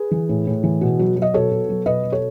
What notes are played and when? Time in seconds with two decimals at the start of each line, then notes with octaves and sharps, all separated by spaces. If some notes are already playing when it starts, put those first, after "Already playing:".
Already playing: G#4 B4
0.11 E3
0.29 A2
0.47 A2
0.64 E3
0.81 B2
0.99 F#3
1.16 F#3
1.22 D#5
1.34 B2 A4 C#5
1.51 B2
1.69 F#3
1.86 B2 B4 D#5
2.03 F#3
2.12 A4 C#5